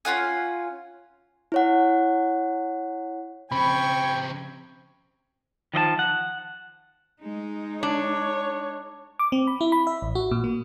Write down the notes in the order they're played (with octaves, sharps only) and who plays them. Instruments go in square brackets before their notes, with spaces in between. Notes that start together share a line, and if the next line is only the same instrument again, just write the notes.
[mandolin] C#4 F4 F#5 G#5
[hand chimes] E4 C#5 F#5
[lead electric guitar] C#3 C4 [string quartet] F3 C#6 G#6 [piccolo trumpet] G5 [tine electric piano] B5
[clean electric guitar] D#3 F3 D#5 A5
F#5
[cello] G#3 D#4
[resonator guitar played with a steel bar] D4 [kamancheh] C#5
[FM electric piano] D6
C4
B5
E4
B5
E5
A1
F#4
A#2
A#3